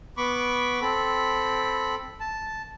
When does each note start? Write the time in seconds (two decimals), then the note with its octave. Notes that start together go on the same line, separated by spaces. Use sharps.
0.17 B3 B5 C#6 D6
0.81 C4 A4 B5
2.20 A5